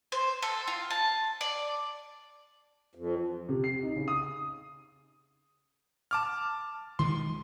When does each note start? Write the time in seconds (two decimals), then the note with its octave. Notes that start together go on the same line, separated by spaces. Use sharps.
0.12 C5
0.42 A4
0.67 F4
0.90 A5
1.41 D5
2.95 F2
3.49 C3
3.64 C7
3.83 D#4
3.96 C#3
4.08 D#6
6.11 A5 D6 F6
6.99 D#3 F3 G#3 C6